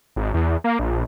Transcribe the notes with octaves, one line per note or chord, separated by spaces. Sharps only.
G#1
E2
A#3
A#1